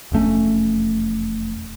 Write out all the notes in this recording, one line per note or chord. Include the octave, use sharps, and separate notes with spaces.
E1 F2 A3 C#4